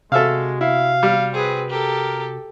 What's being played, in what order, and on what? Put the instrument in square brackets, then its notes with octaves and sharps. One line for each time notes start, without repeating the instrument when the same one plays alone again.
[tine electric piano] C3 F#4 [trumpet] G#3 [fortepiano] A4 E5 F5
[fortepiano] E4 [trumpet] F5
[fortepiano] G3
[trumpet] C4 [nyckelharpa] G#4 B4
[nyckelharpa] G4 A4 [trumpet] A#4